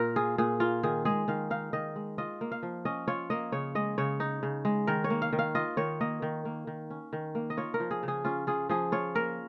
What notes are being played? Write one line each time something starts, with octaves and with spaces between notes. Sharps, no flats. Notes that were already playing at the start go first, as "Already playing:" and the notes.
Already playing: A#2 A#3 A#4
F4 G#4
A#2 G#4
A#3 F4
D#3 G#4
G#3 G#4
D#3 F5
D#4 F5
D#3 D#5
G#3
F4 D#5
A#3
F5
F3
C#4 D#5
F4 C#5
A#3 D#5
C#3 C#5
G#3 D#5
C#3 C#5
D#4
C#3
G#3
D#3 A#4
C#5
A#3
F5
D#3
F5
F4 D#5
D#3 C#5
A#3 D#5
D#3
A#3
D#3
C#4
D#3
A#3
D#5
F4 C#5
A#4
F3
G#4
C#3
G#4
C#4 F4
F4 G#4
F3 G#4
F4 C#5
A#3 A#4